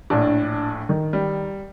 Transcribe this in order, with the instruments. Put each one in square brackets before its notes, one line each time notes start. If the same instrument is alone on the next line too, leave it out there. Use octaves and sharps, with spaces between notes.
[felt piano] A#1 A2 [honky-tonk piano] D4
[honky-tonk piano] D#3
[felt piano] G3